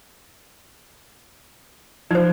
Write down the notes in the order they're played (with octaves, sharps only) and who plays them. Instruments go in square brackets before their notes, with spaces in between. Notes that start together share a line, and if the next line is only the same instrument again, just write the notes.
[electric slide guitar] F3 [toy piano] D#4 C5